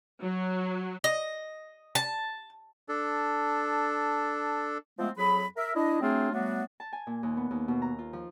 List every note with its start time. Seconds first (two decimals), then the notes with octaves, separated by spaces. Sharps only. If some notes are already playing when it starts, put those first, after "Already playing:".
0.21 F#3
1.04 D#5
1.95 A5
2.89 D4 A4
4.98 F3 G#3 A3 B3 C4 F4
5.16 F2 F#3 G#4 B5
5.57 A#4 E5
5.75 D4 E4 D#5
6.01 F#3 A3 C4 D4 F4 G#4
6.33 F#3 G3 A3 B3 D4 F#4
6.80 A5
6.93 G#5
7.07 A#2
7.23 D#2
7.37 B3
7.51 D#2
7.68 B2
7.82 A#5
7.99 F4
8.13 F3